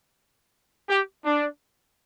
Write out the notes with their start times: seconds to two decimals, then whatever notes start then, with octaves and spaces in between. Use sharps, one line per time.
0.89 G4
1.24 D4